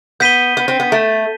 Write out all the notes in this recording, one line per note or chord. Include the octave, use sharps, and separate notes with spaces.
B3 G6 B6 D#7 G7
B3
C4
B3
A3